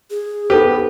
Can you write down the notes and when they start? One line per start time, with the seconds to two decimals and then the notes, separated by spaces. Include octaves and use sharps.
0.11 G#4
0.50 B3 D#4 G4 A4 B4 C5